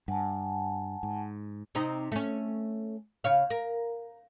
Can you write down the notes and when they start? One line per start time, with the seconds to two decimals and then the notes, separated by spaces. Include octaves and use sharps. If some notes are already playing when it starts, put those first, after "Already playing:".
0.08 G2 F#5 G#5 A5
1.03 G#2
1.75 C3 C4 D#4
2.12 A3 C#4
3.24 C#3 C#5 F5
3.50 A#4